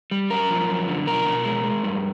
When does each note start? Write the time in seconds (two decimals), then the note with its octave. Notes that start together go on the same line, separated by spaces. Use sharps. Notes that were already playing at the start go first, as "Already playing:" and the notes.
0.11 G3
0.30 F#2 A#4
0.50 F3
0.69 F#2
0.88 D3
1.06 B2 A#4
1.25 B2
1.45 G#3
1.64 G#3
1.84 G2